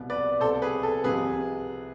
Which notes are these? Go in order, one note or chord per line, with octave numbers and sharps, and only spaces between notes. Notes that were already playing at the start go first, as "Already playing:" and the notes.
Already playing: C2 B2
B4 D5
C2 B2 A4 C5
G#4 B4
A4
C2 C3 F3 G#4 B4